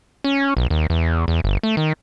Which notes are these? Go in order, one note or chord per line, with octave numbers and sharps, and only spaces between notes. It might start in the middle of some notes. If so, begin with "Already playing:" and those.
C#4
B1
D#2
E2
E2
G1
A3
D#3